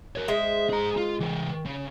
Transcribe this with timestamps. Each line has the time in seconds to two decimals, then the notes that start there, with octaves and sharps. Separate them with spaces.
0.16 A#4 C#5
0.28 G#3 C5 D#5 E5
0.69 G#4 A#5
0.97 F4
1.20 E3 A#4
1.65 C#3